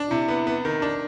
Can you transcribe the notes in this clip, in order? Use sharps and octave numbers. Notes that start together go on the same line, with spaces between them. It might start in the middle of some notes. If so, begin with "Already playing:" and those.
Already playing: D4
C3 E4
B3
B3
D#3
D4